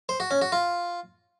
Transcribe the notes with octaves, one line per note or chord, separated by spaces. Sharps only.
C5
F#4
C#4
F#4
F4